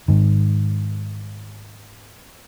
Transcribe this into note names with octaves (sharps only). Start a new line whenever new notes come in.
G#2 D#3